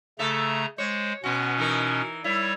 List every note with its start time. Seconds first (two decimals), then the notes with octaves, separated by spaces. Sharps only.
0.19 C#3 A3 A4 E5 A#5
0.78 G#3 C5 C#5
1.24 B2 B3 C#4 F#4
1.58 E3 D#4 A#4
2.24 G3 E4 C#5